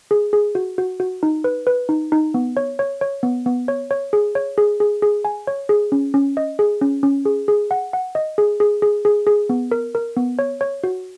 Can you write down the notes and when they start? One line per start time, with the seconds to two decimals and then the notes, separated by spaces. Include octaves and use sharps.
0.11 G#4
0.33 G#4
0.55 F#4
0.78 F#4
1.00 F#4
1.23 D#4
1.44 B4
1.67 B4
1.89 D#4
2.12 D#4
2.34 B3
2.57 C#5
2.79 C#5
3.01 C#5
3.23 B3
3.46 B3
3.68 C#5
3.91 C#5
4.13 G#4
4.35 C#5
4.58 G#4
4.80 G#4
5.02 G#4
5.25 G#5
5.47 C#5
5.69 G#4
5.92 C#4
6.14 C#4
6.37 D#5
6.59 G#4
6.81 C#4
7.03 C#4
7.25 G#4
7.48 G#4
7.71 F#5
7.93 F#5
8.15 D#5
8.38 G#4
8.60 G#4
8.82 G#4
9.05 G#4
9.27 G#4
9.50 B3
9.72 A#4
9.95 A#4
10.17 B3
10.39 C#5
10.61 C#5
10.84 F#4